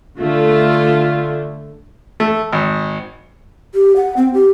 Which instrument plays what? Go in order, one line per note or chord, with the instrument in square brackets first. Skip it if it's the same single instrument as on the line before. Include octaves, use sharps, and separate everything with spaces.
[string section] D3 A3 [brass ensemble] F4
[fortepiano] A3
G#1
[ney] G4
F#5
C4
G4